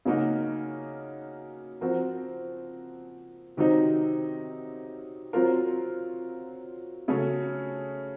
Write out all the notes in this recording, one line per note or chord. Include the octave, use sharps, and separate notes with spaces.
C#3 F#3 A#3 D#4 F#4
F3 C4 F#4 A#4
C3 D#3 F#3 C4 D#4
F#3 C4 F4 A#4
C#3 F#3 A3 C#4 A4